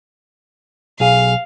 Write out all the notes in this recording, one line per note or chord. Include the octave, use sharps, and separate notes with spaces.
B1 G#4 F5